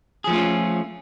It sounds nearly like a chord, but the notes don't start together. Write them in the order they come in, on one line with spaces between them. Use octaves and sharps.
G#4 F3 A3 F4 C#4